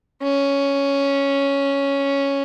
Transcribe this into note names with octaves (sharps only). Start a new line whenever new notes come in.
C#4